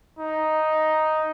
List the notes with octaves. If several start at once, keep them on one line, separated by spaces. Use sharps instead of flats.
D#4